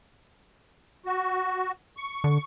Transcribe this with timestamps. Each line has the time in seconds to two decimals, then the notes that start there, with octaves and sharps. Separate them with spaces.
1.06 F#4
1.97 C#6
2.24 D3